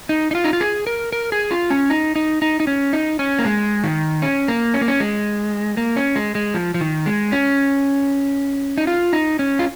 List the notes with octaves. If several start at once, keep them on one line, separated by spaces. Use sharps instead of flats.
D#4
D#4
F4
D#4
F4
G#4
A#4
A#4
G#4
F4
C#4
D#4
D#4
D#4
D#4
C#4
D#4
C#4
A#3
G#3
D#3
C#4
A#3
C#4
A#3
C#4
G#3
A#3
C#4
G#3
G#3
F3
F3
D#3
G#3
C#4
D#4
F4
D#4
C#4
F4